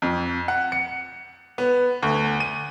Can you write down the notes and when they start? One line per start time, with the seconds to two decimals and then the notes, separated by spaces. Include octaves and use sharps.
0.02 F2
0.48 F#5
0.72 C#7
1.58 B3
2.02 D2
2.40 D#7